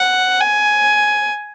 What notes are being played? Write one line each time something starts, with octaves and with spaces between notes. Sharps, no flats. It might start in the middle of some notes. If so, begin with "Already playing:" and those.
Already playing: F#5
G#5